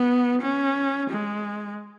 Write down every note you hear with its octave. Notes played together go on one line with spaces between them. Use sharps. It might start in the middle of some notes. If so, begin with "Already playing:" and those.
Already playing: B3
C#4
G#3